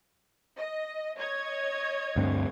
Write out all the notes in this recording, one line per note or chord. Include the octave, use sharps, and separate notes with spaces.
D#5
C#5 D#5 G#6
D2 G2 C4